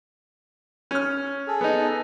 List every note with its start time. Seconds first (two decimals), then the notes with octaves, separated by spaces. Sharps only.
0.91 C#4 F6
1.47 G#4 A4
1.61 B3 D#4